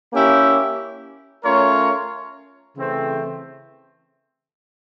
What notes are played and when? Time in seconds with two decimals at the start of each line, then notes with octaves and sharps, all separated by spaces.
0.13 A#3 C#4 E4 G4
1.44 A3 C#4 F4 A#4 C#5
2.75 C#3 E3 A3 C4